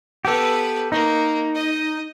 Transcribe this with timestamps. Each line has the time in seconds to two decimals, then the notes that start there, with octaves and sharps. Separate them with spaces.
0.25 B3 G4 A4 B4
0.92 A#3 D#4
1.55 D#5